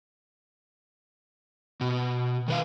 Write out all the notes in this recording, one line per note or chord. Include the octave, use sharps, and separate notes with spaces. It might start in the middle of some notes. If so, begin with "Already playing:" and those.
B2
D#3 B4 F5